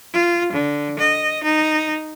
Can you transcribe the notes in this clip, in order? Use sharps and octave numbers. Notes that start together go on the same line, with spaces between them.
F4
D3
D#5
D#4